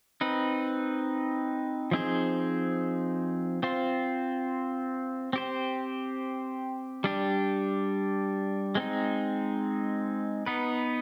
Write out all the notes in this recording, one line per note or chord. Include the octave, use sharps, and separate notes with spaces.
C4 D#4 B4
F3 C4 D#4 G#4 C5
C4 F4 C5
C4 G4 C5
G3 D4 G4
G#3 C4 D#4
B3 D#4 B4